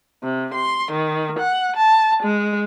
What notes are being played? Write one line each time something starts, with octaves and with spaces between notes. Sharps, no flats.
C3
C6
D#3
F#5
A5
G#3